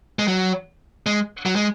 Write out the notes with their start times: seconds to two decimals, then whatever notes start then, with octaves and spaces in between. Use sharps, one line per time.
0.19 G#3
0.28 F#3
1.06 G#3
1.46 F#3
1.56 G#3